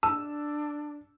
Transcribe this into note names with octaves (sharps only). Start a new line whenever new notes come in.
D4 A5 E6